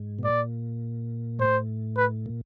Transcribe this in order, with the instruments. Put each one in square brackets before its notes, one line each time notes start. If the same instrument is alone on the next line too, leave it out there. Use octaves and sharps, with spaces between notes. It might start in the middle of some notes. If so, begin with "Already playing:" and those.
Already playing: [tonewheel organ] G#2
B2
[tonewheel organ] A#2 [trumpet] D5
[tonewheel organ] A2 [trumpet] C5
[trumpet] B4
[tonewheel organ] A#2